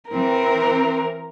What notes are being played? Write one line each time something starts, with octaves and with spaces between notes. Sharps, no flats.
E3 C4 A#4